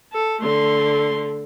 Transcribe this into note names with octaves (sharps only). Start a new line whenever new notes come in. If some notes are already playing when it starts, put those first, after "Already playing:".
A4
D3 A3 C6